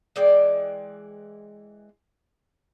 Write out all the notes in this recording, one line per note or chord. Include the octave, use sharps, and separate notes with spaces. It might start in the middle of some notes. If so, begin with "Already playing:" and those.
E3 G#3 D5 G5